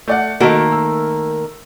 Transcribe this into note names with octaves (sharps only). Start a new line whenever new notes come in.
A3 D5 F#5
D#3 A3 A#3 F#4 A4
E6